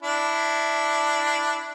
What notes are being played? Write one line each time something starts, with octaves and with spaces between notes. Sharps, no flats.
D4 E4